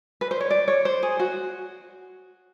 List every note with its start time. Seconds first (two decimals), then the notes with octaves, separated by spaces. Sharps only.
0.21 B4
0.31 C5
0.41 C#5
0.51 D5
0.68 C#5
0.85 C5
1.03 G#4
1.19 F#4